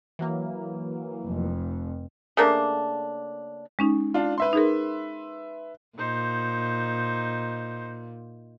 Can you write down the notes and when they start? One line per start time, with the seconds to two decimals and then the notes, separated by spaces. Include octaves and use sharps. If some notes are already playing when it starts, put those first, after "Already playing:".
0.19 E3 F#3 A#3
1.24 F1 F2
2.37 C#3 A3 A#3 D4
3.79 G#3 C#4 D#4
4.14 D4 F4
4.38 B4 E5 C6
4.53 D#4 G#4 A#4
5.98 A#2 D#4 C5